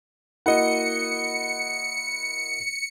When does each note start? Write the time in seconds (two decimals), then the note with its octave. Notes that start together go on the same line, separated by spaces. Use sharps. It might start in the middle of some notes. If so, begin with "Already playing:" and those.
0.46 A#3 E4 F#4 D#5 F#5 C#7